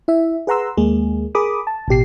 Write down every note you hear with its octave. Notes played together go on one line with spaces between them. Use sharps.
E4 E5
G#4 B4 F#5 A#5 C6 E6
D#2 G#3 A#3 G#4
G#4 A#4 B5 D6 D#6
A5
A1 B2 G4 C7